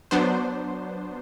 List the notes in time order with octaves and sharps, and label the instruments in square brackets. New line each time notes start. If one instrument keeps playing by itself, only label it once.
[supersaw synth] F#3 B3 D4 C5